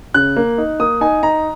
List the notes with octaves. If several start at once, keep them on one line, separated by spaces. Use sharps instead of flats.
C#3 F#6
A#3
D#4
A#3 D#6
D#4 G#5
D#4 A#5